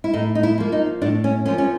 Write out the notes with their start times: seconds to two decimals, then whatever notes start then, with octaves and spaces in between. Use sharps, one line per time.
0.04 E4
0.13 A2 D#4
0.35 D#4
0.43 E4
0.58 F3 A#3
0.72 D#4
1.02 A2 D4
1.24 C#4
1.46 F3 A#3 C#4
1.58 C#4